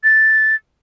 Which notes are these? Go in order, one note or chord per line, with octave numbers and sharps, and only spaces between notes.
A6